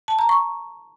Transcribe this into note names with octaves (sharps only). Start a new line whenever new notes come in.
A5
A#5
C#6